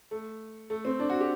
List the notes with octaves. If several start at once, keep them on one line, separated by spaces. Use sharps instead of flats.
A3
A3
C4
D4
F#4
G4